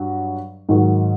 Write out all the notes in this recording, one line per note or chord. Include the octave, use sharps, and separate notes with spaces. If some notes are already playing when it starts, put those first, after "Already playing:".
Already playing: G2 F#3
G#2 D#3 F#3